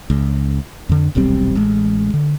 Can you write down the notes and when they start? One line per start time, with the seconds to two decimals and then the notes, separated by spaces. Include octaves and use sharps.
0.10 C#2
0.89 F2 D3
1.15 D#1 B1 G3 C4
1.55 A1 G#3
2.14 D3